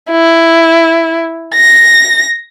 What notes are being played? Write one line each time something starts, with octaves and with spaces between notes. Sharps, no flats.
E4
A#6